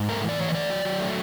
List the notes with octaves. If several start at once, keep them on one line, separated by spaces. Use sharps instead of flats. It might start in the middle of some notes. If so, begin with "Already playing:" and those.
Already playing: G#2
A3 A#4
E3 D5
E3 C#5
D#5
A3 D5
F#3
F#3
A3